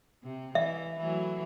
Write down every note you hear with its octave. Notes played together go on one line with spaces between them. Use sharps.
C3
E3 E5
E3 F#3 A3